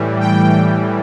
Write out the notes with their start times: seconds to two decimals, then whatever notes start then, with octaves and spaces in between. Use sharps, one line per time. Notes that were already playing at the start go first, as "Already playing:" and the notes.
Already playing: A2 E3 G3
0.20 G5